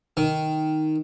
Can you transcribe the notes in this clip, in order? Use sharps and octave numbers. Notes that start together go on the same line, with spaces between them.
D#3